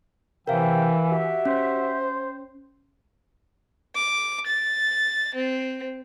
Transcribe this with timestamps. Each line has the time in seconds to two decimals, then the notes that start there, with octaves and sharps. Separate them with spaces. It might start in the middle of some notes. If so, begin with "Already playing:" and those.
0.47 C3 E3 A#4 F5 G5
1.10 F#4 G4 E5
1.45 C#4 C5
3.96 D6
4.47 A6
5.35 C4